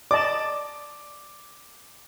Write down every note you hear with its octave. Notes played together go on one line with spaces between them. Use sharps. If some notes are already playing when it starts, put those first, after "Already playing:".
D5 D#5 A5 D6